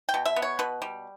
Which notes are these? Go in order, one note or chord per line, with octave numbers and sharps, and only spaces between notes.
G5
B2
E5
B3
C#5
B2 B4
G3